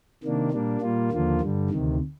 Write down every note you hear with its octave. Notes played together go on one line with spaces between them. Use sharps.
C3 D#3 A#3 D4
A#2 G3 A#3 D4
A#2 G3 A#3 F4
D#2 D3 F3 A#3 F4
G2 D3 G3
D2 C3 D#3